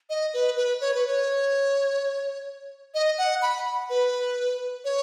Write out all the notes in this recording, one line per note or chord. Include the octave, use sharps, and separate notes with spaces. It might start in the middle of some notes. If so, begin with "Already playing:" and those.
D#5
B4
B4
C#5
B4
C#5
D#5
F#5
B5
B4
C#5